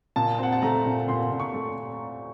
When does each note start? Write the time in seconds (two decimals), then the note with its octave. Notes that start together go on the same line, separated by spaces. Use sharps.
0.16 A#2 A5
0.39 C4 F#5
0.52 A5
0.62 A3 A#5
0.86 A#2
1.08 A#2 C6
1.32 A#2
1.40 C#6
1.54 A3